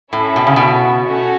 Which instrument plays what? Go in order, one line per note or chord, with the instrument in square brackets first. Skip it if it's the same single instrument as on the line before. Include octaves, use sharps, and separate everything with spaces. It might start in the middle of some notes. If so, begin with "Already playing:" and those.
[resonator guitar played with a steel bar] A2 [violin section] C#4 E4 A4 E5
[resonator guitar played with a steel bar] B2
C#3
B2
[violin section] A3 C#4 F#4